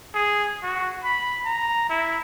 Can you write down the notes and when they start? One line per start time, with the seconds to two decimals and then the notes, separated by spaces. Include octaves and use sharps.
0.14 G#4
0.63 F#4
1.04 B5
1.45 A#5
1.90 E4